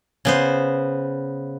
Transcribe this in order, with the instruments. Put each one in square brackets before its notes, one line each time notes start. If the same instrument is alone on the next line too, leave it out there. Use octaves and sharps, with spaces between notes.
[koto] C#3 B3 C5